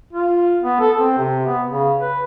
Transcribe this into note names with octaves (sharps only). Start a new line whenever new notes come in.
F4
B3
A4
C4
C3
B3
C#3
B4